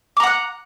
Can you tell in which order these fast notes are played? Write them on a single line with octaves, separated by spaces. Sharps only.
D6 A#5 F#5 F#6